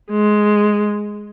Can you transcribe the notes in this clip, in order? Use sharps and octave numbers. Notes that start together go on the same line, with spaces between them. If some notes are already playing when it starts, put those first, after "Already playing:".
G#3